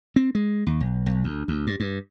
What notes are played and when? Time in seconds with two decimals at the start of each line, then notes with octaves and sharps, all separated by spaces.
0.16 C4
0.35 G#3
0.67 D#2
0.80 B1
1.06 B1
1.24 D2
1.48 D2
1.67 G2
1.80 G2